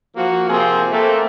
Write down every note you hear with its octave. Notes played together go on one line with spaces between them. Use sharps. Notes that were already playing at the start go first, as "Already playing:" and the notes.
F3 A#3 F#4
C3 F3 A#3 C4 G4 G#4
A3 A#3 C4